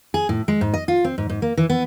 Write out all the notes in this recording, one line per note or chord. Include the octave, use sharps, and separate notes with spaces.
G#4
A2
G#3
G#2
D#5
F4
C4
G#2
G#2
A#3
E3
B3